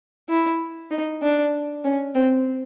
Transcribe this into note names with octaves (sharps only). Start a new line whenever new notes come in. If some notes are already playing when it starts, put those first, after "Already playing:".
E4
D#4
D4
C#4
C4